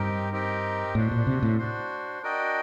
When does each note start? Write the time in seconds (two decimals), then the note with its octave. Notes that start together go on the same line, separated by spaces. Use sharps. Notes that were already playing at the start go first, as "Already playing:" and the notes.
Already playing: G2 C4 D#4 G4 A#4
0.32 C4 D#4 G4 A#4
0.95 A2 D4 F#4 C5
1.11 A#2
1.27 C3
1.43 A2
1.59 D4 F#4 C5
2.23 D4 F#4 A#4 D#5 G5